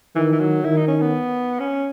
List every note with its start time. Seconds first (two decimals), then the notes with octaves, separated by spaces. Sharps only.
0.16 D#3 E3
0.33 E3
0.41 F#3
0.64 D#3 E4
0.77 D#4
0.88 C#4
1.01 B3
1.60 C#4